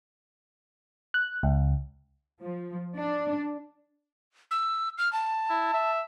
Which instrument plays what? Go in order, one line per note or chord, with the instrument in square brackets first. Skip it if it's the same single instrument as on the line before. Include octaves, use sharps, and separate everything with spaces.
[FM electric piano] F#6
C#2
[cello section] F3
D4
[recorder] E6
F6
A5
[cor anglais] E4
E5